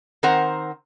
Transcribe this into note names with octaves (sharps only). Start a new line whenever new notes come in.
D#3 C4 A#4 C5 F#5 A#5